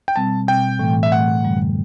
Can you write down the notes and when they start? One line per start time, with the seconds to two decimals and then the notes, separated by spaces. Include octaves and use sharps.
0.08 G5
0.16 B2 G3 C4 A5
0.48 B2 G3 C4 G5
0.79 A2 E3 A3
1.03 E5
1.11 A2 E3 A3 F#5
1.44 F#2 D3 G3